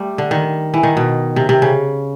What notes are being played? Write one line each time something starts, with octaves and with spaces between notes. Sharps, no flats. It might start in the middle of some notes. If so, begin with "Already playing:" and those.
Already playing: G3 A3
D3
D#3
E3
D#3
B2
C3
C3
C#3